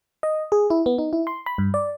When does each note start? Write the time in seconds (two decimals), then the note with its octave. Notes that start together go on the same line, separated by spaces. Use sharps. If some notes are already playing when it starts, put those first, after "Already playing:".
0.23 D#5
0.52 G#4
0.70 E4
0.86 B3
0.98 D#4
1.13 E4
1.27 C6
1.46 B5
1.58 G2
1.74 D5